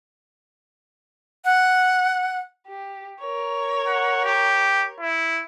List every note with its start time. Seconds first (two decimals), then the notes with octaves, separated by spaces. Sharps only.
1.45 F#5
2.67 G4
3.20 A#4 C#5
3.86 F#5
4.25 G4
5.00 E4